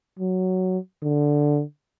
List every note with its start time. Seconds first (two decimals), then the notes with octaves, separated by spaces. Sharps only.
0.19 F#3
1.03 D3